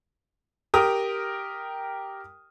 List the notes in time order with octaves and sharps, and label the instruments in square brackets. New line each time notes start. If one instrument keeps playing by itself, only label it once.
[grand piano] G4 A#4 G5 D#6 F6